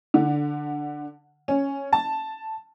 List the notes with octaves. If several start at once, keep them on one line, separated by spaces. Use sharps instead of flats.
D3
C#4
A5